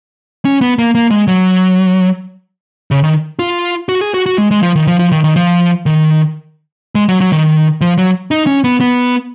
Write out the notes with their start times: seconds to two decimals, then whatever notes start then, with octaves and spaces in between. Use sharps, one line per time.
0.45 C#4
0.61 B3
0.79 A#3
0.95 A#3
1.11 G#3
1.28 F#3
2.91 C#3
3.04 D#3
3.39 F4
3.89 F#4
4.01 G#4
4.14 F#4
4.26 F#4
4.38 G#3
4.51 G#3
4.63 F3
4.75 D#3
4.87 F3
4.99 F3
5.12 D#3
5.24 D#3
5.36 F3
5.86 D#3
6.95 G#3
7.09 F#3
7.21 F#3
7.32 D#3
7.81 F3
7.98 F#3
8.31 D#4
8.47 C#4
8.64 B3
8.80 B3